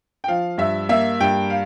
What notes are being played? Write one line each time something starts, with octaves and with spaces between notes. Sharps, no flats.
G5
F3 F5
G2 E5
A#3 E5
G2 G5
F5